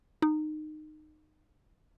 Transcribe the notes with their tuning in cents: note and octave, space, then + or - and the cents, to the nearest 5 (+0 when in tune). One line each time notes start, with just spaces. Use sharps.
D#4 -20